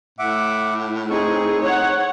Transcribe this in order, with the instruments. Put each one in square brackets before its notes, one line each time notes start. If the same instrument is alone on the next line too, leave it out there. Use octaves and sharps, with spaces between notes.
[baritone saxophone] A2 [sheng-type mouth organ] E5 F#5 D6
[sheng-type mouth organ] C4 D#4 C#6 [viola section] G#4
[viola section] C#5 F#5